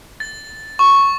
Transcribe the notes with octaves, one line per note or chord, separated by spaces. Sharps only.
A6
C#6